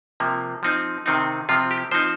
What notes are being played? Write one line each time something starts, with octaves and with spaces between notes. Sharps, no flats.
C3 F3 A#3
F3 C4 D#4
C3 D#3 C4 D#4
C3 F3 C4 F4
G4
F3 C4 D#4 C5